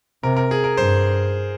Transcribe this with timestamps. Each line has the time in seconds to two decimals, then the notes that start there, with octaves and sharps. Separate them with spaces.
0.23 C3 A#4
0.37 A#4
0.51 G#4
0.64 A#4
0.77 G2 C5